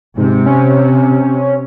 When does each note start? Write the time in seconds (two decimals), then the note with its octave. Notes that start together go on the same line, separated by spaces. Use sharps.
0.17 G#2 C3
0.46 C#4